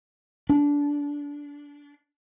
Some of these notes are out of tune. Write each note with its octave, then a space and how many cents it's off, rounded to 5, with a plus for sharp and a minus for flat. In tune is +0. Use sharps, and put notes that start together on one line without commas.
D4 -20